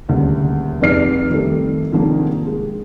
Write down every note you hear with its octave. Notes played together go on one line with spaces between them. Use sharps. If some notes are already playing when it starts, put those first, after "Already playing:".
D#1 D2 A#2 C#3
F1 F2 G#2 D5 F6 C7
F2 D#3 G3 A3
G#2 C3 D#3 F3 A#3 D4
G#3